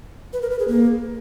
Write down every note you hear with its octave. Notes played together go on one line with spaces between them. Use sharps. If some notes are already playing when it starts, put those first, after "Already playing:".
B4
A#4
B4
G#4
A#3